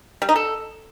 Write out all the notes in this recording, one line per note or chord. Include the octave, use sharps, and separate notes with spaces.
G3
D#4
A4